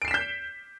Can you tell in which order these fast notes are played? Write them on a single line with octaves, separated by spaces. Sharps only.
D7 C7 E7 B6 G6